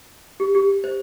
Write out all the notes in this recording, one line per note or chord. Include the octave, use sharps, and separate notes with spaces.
G4
G4
C5